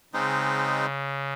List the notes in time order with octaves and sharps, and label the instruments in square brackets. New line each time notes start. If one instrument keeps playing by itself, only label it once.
[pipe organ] C#3 [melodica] G#3 C4 D#4